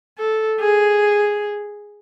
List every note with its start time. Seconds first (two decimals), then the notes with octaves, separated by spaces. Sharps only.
0.18 A4
0.59 G#4